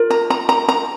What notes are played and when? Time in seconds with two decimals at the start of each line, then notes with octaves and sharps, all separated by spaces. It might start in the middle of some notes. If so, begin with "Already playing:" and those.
Already playing: F4 A#4
0.10 A#5
0.30 A#5
0.49 A#5
0.68 A#5